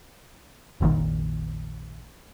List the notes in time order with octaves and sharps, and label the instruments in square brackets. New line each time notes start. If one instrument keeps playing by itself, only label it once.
[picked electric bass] F1 A#1 A#2 D#3